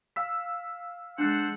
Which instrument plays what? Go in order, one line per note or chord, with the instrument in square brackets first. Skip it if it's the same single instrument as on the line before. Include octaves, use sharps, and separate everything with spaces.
[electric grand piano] F5 E6 B6
[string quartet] G#3 [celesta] D4 F#6 [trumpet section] A4 C5 F#5